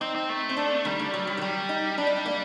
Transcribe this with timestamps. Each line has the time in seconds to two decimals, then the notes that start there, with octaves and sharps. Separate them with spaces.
0.01 C4 D#4
0.15 C4
0.29 A3
0.49 C4
0.57 D4
0.85 D#3 G3
0.99 D3
1.14 F#3
1.27 F#3
1.37 D#3
1.41 F#3 G3
1.69 D#4
1.98 G3 D4
2.07 D#4
2.17 D4
2.26 A#3